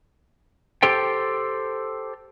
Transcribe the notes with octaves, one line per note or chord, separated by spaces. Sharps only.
G4 A4 C5 G5